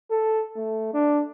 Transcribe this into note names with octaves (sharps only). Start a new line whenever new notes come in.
A4
A3
D4